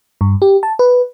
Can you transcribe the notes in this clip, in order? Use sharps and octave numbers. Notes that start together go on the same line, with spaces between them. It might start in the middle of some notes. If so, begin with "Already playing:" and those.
G2
G4
A5
B4